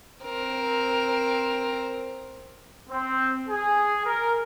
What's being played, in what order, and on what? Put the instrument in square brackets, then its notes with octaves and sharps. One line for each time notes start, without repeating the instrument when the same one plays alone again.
[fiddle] C4 A#4
[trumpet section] C4
G#4
A#4